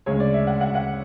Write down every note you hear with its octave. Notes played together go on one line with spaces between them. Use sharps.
D2 C#3 G#3 C#5
D5
E5
F#5
F#5
F#5